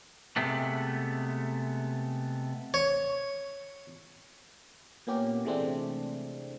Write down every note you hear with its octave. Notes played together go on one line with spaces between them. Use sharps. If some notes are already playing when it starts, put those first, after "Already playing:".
C3 G#3 A3 B3
C#5
A#2 A#3 B3 C#4 G4
C3 E3 G#3 A3 C4 D4